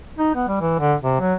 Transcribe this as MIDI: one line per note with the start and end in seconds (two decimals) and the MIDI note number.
0.18 0.30 63
0.35 0.47 59
0.48 0.59 55
0.61 0.74 52
0.79 0.94 50
1.03 1.18 48
1.20 1.34 54